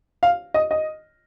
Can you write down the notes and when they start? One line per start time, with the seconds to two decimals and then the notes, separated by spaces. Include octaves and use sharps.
0.23 F5
0.54 D#5
0.71 D#5